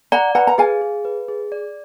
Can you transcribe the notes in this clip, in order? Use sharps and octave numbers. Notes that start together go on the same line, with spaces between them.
D5 F#5 A#5
B4 F#5 A#5
A#5
G#4 F5 G#5
G#4
B4
G#4
D5